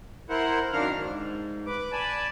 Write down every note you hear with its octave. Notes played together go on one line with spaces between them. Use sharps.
E4 A#4 C5 F#5
F#2 D#3 D4 A#4 F5 F6
G#2
B4 D6
D5 G#5 A5 B5